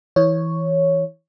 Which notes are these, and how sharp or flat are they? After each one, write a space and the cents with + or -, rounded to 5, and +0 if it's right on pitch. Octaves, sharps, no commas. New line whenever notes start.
E3 -10 C#5 +0